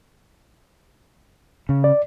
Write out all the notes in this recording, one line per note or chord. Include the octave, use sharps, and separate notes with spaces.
C#3
D5